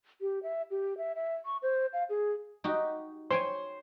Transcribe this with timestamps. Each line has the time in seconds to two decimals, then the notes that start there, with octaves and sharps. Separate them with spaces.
0.21 G4
0.43 E5
0.71 G4
0.98 E5
1.15 E5
1.45 C#6
1.62 C5
1.93 F5
2.09 G#4
2.64 D#4 F#4 G4
3.30 C5 C#5 G5 G#5